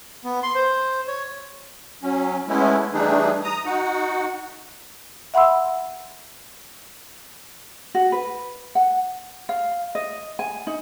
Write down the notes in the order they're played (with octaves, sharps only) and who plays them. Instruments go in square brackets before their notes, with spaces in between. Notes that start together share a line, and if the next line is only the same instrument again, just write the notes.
[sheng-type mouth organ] B3
C6
C5
C#5
[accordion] F#3 C#4
G#3 A3 B3 C#4 E4
E3 G3 A3 D4 D#4 G#4
A#5 D#6
D#4 F#4 F#5
[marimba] E5 F#5 B5 C6 E6
[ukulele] F#4
B4
F#5
F5
D#5
G#5
D#4